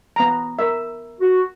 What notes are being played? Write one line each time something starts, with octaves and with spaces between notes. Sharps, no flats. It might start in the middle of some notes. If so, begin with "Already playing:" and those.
B3 A#5
A#4 E5
F#4